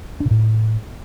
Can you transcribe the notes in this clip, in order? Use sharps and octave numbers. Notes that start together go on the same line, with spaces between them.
D4
B2
A2